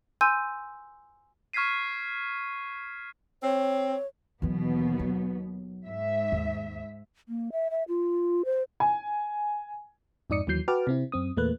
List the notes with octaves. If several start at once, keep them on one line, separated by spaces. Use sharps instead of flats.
G#5 C6 E6 G6 D#7
C#6 F6 G#6 B6 C7 D#7
C4 C#5
D#2 B2 E3 F#3 B3
F#3
G#2 E5
D#2
A#3
E5
E5
F4
C5
G#5
F2 G#2 D#4 D5 D#6 C#7
D#2 D#3 E3 F#3 G6 C7
F#4 B4 G5 A5 D6 F6
C3 C4 E4
F#2 C4 D#6
E2 A#2 A3 A#3 B4 F#6